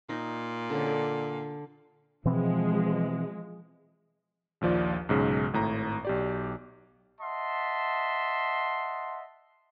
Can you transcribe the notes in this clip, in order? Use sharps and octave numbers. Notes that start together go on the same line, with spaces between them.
A#2 D#4
D3 G#3 C#4
A4 D5
B2 E3 F3 G#3 C4
A#1 D#2 F3 D5
B1 G#2 C#3
G#1 A2 A#5
B1 G4 D5
D#5 E5 F#5 A5 C6